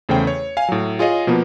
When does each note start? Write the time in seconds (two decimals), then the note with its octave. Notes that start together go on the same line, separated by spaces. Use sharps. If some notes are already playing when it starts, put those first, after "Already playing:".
0.09 E2 C#3 A3 C5 G5
0.27 C#5
0.57 F5 G#5
0.69 A2 F#3
0.99 F4 G#4 C#5 D#5 F5
1.27 B2 F3 A#3 B3